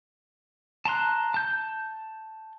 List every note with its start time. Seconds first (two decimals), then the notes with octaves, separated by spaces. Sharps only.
0.85 A5 A#5 C6 F#6
1.34 A5 G6